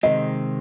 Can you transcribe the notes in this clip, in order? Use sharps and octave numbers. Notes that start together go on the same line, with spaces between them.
C3 D#3 G#3 C4 D#5